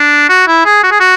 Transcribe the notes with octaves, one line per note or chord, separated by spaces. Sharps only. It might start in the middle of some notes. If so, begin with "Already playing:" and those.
Already playing: D4
F#4
E4
G#4
F#4
G#4
F#4